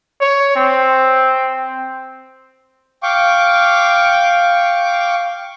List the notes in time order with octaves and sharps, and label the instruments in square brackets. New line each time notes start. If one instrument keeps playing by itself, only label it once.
[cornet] C#5
C4
[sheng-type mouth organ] F5 G5 C#6 D6